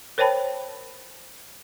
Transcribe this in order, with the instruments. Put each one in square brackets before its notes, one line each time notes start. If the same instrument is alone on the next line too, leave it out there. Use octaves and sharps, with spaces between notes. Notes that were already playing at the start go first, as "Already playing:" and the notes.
[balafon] A#4 C5 C#5 G5 A5 B5